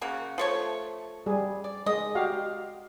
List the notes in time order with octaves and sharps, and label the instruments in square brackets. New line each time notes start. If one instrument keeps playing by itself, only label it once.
[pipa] C#3 A#3 F#4
F3 A3 C#5
[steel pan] G3 G#4
[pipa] D5
[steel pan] G#3 [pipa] D#5
[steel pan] F#4 G4 F5